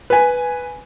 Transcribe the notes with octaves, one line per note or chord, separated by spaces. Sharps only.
B4 G#5